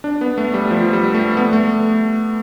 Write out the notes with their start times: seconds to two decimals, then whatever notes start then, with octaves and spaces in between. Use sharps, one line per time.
0.04 D4
0.21 B3
0.38 A3
0.54 G3
0.71 F3
0.93 G3
1.15 A3
1.37 B3
1.53 A3